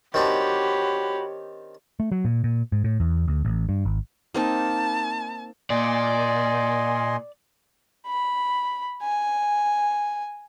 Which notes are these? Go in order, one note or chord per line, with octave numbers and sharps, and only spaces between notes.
D#3 C4 D4 F#4 G4 C#5 B5
A3
F#3
A#2
A#2
G#2
A2
E2
D2
A1
G2
G#1
A#3 C4 D#4 A5
A#2 D5 D#5 G#5 C6
B5
G#5